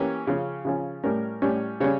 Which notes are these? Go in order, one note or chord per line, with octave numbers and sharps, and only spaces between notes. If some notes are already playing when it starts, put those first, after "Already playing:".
Already playing: E3 A#3 C#4 G4
C#3 F3 C#4
C#3 F3 C#4
A2 G3 C#4 A#4
A2 G3 C#4
C#3 G3 C#4 C#5